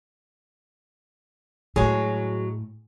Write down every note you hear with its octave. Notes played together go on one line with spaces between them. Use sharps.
A2 F#3 G#3 G#4